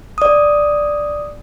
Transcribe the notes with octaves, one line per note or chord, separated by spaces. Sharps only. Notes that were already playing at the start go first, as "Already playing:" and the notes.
D5 D#6